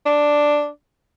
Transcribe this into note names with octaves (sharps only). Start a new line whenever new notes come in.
D4